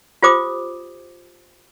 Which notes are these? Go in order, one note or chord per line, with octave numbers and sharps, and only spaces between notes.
F4 G4 C5 D6 D#6